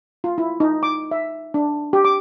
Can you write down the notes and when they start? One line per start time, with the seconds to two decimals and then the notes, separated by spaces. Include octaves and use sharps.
0.24 F4
0.38 E4
0.60 D#4
0.83 D6
1.11 E5
1.54 D4
1.93 G4
2.05 D6